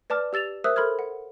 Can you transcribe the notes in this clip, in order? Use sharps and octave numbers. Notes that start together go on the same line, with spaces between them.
B4 D5 A5 D6 F6
G4 E6 A6 E7 F7
A#4 C5 E5 D#6 E6 F#6
A4 A#4 B5 C6 F6 G#6
F#5